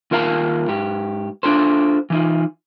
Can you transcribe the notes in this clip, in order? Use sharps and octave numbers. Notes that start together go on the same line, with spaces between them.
D#2 F4 A#4 F5 A5 A#5
G#2 G4
D4 F4 A4 C5
E3 D#4 F4